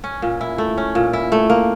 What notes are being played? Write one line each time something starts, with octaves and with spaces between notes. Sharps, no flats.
C#4
A#2
E4
A3
C#4
A#2
E4
A3
A#3